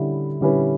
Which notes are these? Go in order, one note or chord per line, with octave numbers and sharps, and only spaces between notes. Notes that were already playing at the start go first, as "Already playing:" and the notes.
Already playing: D3 G3 C#4 E4
D3 G3 C#4 E4 B4